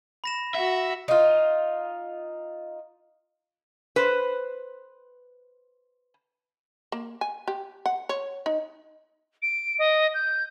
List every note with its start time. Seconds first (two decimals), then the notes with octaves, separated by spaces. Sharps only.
0.24 B5 A#6 E7
0.54 F#4 E5
1.08 D#4 F4
3.96 B4 C5
6.92 A#3
7.21 G#5
7.48 G4
7.86 F#5
8.09 C#5
8.46 D#4
9.42 D7
9.79 D#5
10.14 G6